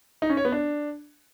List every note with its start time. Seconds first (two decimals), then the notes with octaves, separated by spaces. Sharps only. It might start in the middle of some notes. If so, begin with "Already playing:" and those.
0.22 D#4
0.30 C#4
0.37 C#5
0.45 B3
0.52 D4